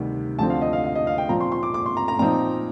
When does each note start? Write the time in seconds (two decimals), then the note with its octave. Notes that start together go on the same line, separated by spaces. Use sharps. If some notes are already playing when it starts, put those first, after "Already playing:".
Already playing: D2 C3 D#3 G3
0.38 D2 D3 F3 C4 A5
0.50 F5
0.61 D#5
0.73 F5
0.84 F5
0.95 D#5
1.07 F5
1.18 G5
1.29 A#2 F3 C4 F4 A#5
1.40 C6
1.52 C6
1.63 D6
1.74 D6
1.86 C6
1.97 A#5
2.08 A#5
2.19 A#2 F3 C4 D#4 A#5